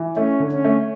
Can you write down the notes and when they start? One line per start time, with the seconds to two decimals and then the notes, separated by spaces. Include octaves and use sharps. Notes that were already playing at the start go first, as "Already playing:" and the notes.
Already playing: E3
0.16 A3 C#4
0.40 D3
0.52 C#4
0.64 A3